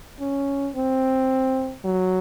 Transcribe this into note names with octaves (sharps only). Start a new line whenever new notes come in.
C#4
C4
F#3